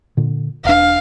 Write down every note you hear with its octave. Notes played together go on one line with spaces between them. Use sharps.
A#2 D3
E1 D4 F5